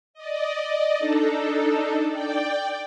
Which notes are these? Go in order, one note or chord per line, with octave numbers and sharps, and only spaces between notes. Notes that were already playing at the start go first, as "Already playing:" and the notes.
D5 D#5
D4 D#4 A4
D5 G5